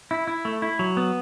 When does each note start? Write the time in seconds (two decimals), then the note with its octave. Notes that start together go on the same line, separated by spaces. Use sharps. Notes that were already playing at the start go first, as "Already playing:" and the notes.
0.11 E4
0.27 E4
0.45 A3
0.62 E4
0.79 F#3
0.97 B3